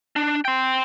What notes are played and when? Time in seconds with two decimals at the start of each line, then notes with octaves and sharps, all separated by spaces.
0.16 D4
0.45 G5 C6